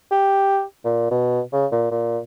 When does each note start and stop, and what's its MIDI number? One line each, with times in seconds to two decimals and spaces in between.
0.11 0.63 67
0.84 1.10 46
1.11 1.41 47
1.53 1.66 49
1.72 1.86 46
1.91 2.19 46